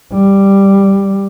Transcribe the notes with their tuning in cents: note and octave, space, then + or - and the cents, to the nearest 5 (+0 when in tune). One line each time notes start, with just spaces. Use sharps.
G3 +5